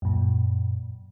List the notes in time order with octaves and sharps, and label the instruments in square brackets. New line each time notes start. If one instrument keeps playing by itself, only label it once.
[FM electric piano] F#2 A#2